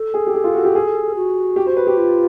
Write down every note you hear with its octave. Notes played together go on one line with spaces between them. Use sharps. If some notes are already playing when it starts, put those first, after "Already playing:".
Already playing: A4
G#4
G4
G#4
F4
F#4
G4
G#4
F#4
G4
C5
B4
G4
F4